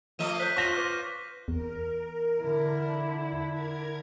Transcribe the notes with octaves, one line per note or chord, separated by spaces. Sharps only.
F3 A3 D#5 D#7 E7
C5 C#5 F#6 G6 B6
F4 C#6 A#6 B6 E7 G7
B4 D6
E2 A#4
D3 E4
A#4 G#6